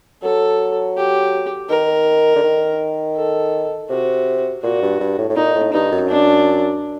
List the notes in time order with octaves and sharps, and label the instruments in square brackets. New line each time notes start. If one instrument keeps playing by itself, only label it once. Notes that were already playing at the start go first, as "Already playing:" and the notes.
[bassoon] F#3 [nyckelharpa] A4
[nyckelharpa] G4
[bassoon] D#3 [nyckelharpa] A#4
[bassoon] D3
D#3
[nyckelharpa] A4
[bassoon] C3 [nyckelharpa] F#4
[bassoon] A#2 [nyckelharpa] F#4
[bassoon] G2
G2
A2
A2
[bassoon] A#2 [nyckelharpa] D#4
[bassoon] A2
[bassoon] G2 [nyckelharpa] D#4
[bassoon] F#2
[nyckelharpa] D4